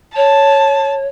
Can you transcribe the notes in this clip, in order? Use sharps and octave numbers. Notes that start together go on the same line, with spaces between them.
C#5 A5